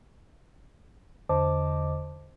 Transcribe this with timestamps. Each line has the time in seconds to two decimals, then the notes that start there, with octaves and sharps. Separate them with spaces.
1.29 E2 D3 C5 D#5 A5 D6